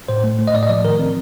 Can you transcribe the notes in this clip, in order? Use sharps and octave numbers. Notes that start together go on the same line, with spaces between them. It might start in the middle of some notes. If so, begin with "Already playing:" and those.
A2 C5
A3
A3
D#5
A2 D5
D#5
F3 D5
D#3 A#4
C4